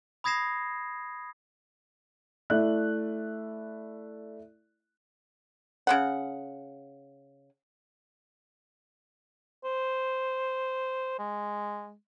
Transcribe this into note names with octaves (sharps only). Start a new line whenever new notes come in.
B5 D#6 G#6 A#6 C7 E7
A3 E4 D5 F#6
C#3 B3 F#5
C5
G#3